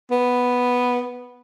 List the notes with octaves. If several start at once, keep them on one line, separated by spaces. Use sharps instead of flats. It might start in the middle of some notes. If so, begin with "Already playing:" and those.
B3